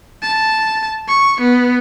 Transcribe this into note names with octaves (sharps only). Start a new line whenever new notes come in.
A5
C#6
B3